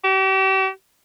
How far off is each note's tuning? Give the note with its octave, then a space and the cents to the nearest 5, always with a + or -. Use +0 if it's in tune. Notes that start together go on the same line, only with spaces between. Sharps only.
G4 -40